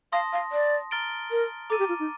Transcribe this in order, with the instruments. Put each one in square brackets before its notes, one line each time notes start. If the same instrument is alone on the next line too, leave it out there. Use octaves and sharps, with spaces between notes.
[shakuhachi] F5 [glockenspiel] A5 C6 D#6 A#6
[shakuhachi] F5
D5
[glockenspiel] A#5 F6 A6 D7 G7
[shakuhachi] A#4
[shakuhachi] A4 [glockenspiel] A#5 D6 A6 D#7
[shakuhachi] G4
F4
D#4